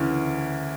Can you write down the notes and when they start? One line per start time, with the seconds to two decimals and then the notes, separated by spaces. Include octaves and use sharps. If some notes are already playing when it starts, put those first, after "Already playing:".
Already playing: D2 C#3 E3